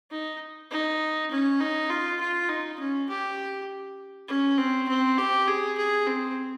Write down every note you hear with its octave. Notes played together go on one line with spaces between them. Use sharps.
D#4
D#4
C#4
D#4
F4
F4
D#4
C#4
G4
C#4
C4
C4
G4
G#4
G#4
C4